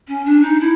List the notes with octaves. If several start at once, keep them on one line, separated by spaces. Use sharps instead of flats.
C#4
D4
D#4
E4